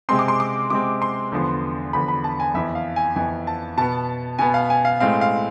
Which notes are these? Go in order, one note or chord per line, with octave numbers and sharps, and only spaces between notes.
C3 G#3 C4 C6
D6
C6
D6
C3 G#3 C4 D6
C6
E2 D3 F3 B3
E2 D3 F3 B3 B5
B5
A5
G#5
F2 E3 B3 E5
F5
G#5
F2 E3 B3 G#5
A5
B2 B3 A5
B2 B3 G#5
F5
G#5
F5
A2 G#3 C4 F5
F5